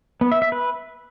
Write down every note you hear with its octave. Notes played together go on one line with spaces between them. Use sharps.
B3
E5
E5
B4